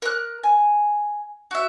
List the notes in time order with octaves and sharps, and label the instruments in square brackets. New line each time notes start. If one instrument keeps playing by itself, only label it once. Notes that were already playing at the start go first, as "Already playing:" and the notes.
[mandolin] A#4 F#6
G#5
F#4 E5